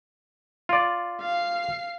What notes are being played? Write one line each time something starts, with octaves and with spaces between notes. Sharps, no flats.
F4 D5
F5 C7